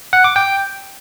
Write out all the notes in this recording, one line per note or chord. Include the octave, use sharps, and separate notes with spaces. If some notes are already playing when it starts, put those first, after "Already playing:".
F#5
D6
G5